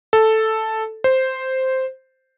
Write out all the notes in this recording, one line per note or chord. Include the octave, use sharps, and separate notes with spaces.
A4
C5